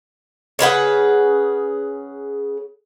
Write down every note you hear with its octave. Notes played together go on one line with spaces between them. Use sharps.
C#3 G#4 B4 F#5